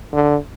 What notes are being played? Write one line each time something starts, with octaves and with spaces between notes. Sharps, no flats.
D3